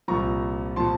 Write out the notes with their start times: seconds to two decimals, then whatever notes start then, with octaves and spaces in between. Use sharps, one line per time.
0.08 C2 A#2 F3 A#5 C#6
0.76 A#2 F3 A5 C6